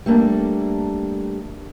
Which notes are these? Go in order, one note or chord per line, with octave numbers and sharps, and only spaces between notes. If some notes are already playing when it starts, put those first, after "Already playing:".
G3 A3 A#3 D4 A4